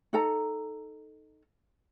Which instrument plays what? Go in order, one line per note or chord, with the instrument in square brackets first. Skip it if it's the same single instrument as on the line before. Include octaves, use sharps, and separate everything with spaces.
[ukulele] D#4 A4 A#5